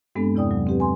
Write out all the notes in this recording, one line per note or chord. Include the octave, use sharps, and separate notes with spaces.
G2 G#3 B3 C4 D4 A4
E2 C3 E4 D5 G5 D#6
F#3
C4 G4 B4
G#5 C6